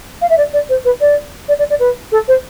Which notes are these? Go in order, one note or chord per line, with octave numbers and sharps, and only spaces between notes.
F5
E5
D5
D5
C5
B4
D5
D5
D5
D5
B4
A4
C5